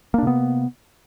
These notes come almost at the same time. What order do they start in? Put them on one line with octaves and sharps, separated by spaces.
A#3 D4 C3 B3